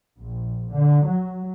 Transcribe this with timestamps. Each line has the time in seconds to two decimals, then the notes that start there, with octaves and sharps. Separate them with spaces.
0.18 A#1
0.70 D3
1.05 F#3